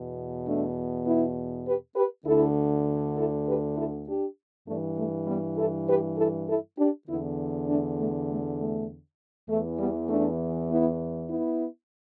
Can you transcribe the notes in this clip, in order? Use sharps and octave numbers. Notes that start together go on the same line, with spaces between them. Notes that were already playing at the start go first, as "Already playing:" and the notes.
Already playing: E2 B2
A3 D4
B3 E4
G4 B4
G4 B4
D2 D3 E4 A4
E4 A4
G4 B4
E4 A4
D4 G4
G2 E3 A3 D4
A3
G3 B3
E4 A4
G4 B4
E4 A4
E4 A4
D4 G4
E2 D3 B3 E4
A3 D4
A3
A3
A3
E2 E3 A3
G3 B3
A3 D4
B3 E4
B3 E4